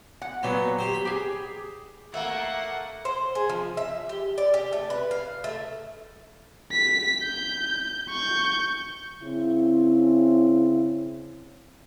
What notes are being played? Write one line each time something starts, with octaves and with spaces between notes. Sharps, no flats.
F#5
A#2 F#3 B3 C4
G4 C5
B5
G4 G#4
A3 A#3 E5 F#5
C5
G#4
F3
E5
G4
D5
G4
A3
B4
F5
A3
B6
G6
C#6 G6
C#3 C4 E4